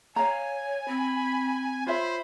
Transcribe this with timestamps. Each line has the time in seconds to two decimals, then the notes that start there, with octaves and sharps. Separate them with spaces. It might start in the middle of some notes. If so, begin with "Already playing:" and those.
0.16 C#5 F5 G#5 A#5
0.88 C4 B5
1.87 F4 C5 C#5 E5 B5